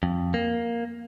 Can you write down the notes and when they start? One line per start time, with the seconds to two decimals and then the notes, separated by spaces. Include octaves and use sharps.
0.03 F2
0.34 A#3